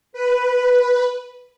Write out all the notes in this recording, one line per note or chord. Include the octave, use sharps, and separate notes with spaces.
B4